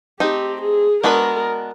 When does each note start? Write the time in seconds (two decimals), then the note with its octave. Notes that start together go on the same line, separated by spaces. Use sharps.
0.20 A3 C4 D#4 G4
0.62 G#4
1.03 G#3 B3 D4 F#4 A#4 B4